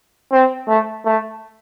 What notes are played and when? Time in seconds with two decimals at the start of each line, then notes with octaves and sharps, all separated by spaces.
0.32 C4
0.68 A3
1.05 A3